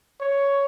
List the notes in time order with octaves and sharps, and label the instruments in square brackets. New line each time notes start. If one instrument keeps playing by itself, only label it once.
[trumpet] C#5